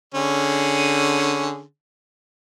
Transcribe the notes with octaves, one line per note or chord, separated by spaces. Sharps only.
D3 C#4 G#4